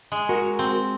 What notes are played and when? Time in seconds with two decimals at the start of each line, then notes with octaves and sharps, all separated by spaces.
0.12 G#3
0.29 F#4 A#4
0.59 C4